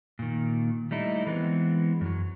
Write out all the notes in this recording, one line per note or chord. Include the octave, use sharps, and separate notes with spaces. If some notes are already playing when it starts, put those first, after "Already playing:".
A#2 D#3
G3 A3 D#4 E4
E3 G#3 B3 C4
F#2 F#3